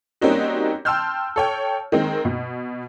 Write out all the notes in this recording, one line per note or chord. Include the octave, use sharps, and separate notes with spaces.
G3 A#3 C4 C#4 D#4 F#4
G5 A5 C6 E6 F6 G6
A4 C#5 G5
D#3 G#3 C4
B2